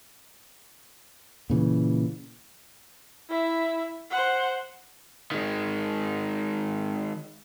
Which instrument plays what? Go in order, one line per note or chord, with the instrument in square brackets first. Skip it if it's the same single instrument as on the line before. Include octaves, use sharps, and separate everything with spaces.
[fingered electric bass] A#2 C#3 E3
[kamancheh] E4 E5
C5 F#5
[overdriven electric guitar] D#3 G#3